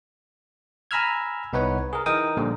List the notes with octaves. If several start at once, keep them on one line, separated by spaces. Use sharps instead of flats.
G#5 A#5 B5 E6 F6 G#6
C2 B3 D#4 B4 C#5 F#5
G#4 A#4
E3 D#4 A#4 G5 D#6
A#2 D3 F3 G3